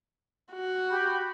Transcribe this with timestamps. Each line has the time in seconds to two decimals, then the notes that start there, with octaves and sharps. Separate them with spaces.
0.52 F#4
0.91 G4 B5 G6